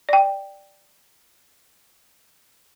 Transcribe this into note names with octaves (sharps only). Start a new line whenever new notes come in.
D5 G5